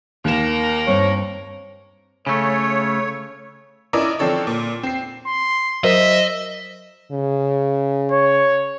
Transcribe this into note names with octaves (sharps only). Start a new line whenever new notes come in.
D#2 A#3 A#4 E7
G2 C4 C#5
C#3 A3 C#5
C#4 D4 E4 A#4 D5 D#5
D3 F3 C4 D4 A4 C#5
A#2
C4 C7
C6
F#3 A#4 C5 D#5 E5
C#3
C#5